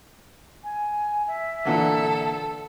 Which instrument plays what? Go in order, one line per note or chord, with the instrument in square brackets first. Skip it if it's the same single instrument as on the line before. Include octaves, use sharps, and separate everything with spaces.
[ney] G#5
E5
[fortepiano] A#2 D3 E3 [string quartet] A4